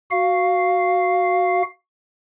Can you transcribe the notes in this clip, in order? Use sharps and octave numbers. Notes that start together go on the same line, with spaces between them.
F#4 F5